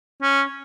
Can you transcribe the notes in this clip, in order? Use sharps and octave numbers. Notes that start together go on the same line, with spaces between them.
C#4